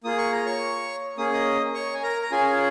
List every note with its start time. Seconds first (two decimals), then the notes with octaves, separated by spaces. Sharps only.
0.04 A#3 F4 G#4 D#6
0.18 C#6
0.32 A#5
0.45 C#5 C#6
1.18 A#3 C#4 G#4 D#6
1.33 D#5 D#6
1.74 C#5 C#6
1.94 G#5
2.03 A#4 A#5
2.23 A#5
2.31 C#4 F4 G#4 G#5